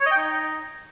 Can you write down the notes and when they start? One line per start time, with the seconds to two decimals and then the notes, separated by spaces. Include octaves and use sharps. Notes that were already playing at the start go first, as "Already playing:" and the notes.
0.01 C#5
0.06 D#5
0.11 G5
0.17 D#4